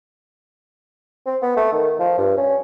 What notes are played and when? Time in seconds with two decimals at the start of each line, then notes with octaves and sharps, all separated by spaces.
1.26 C4
1.42 B3
1.57 A3
1.72 D#3
2.00 F3
2.18 G2
2.37 C#4